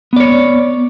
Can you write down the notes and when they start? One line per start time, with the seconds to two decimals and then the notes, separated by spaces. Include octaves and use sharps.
0.13 B3
0.16 D5
0.20 C#5